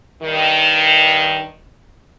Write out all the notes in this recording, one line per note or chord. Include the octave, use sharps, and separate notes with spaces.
G2 D#3